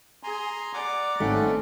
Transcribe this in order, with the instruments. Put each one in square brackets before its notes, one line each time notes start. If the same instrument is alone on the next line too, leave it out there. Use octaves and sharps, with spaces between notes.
[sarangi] G#4 [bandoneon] G#5 A#5 C6
[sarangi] D5 [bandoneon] F#5 A#5 D6
[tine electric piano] G#1 D#4 F#5 [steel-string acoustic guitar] A3 [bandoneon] C4 C#4